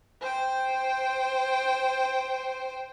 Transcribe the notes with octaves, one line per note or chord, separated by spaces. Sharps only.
C5 G5